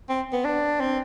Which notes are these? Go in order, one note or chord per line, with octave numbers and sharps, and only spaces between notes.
C4
B3
D4
C4